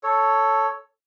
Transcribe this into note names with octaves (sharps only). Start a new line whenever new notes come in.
A4 C#5